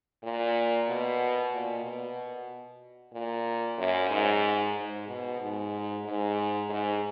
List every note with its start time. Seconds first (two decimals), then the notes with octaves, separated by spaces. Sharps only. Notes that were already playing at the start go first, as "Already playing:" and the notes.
0.23 A#2
0.88 B2
1.52 A#2
1.84 B2
3.13 A#2
3.78 F#2
4.10 G#2
4.76 G#2
5.08 B2
5.40 G#2
6.05 G#2
6.70 G#2